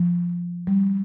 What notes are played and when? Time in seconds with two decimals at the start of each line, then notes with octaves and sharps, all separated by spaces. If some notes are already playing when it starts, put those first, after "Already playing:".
Already playing: F3
0.67 G3